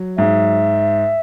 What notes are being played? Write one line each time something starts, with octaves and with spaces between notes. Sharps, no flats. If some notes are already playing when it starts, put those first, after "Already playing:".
Already playing: F#3
G#2 E5